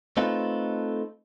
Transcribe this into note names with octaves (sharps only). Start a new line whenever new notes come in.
A3 C4 D#4 F4 A4 B4